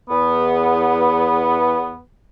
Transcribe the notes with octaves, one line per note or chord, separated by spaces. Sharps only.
E2 B3